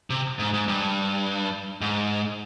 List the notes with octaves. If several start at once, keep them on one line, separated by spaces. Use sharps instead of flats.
C3
G#2
G#2
G2
G#2